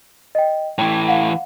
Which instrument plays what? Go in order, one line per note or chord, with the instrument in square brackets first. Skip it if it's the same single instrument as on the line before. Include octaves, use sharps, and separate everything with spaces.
[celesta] D#5 G5
[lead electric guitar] A2 E3 [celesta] G5
[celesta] F5 F#5